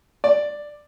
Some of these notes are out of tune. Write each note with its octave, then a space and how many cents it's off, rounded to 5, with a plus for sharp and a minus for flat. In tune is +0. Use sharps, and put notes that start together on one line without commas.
D5 +5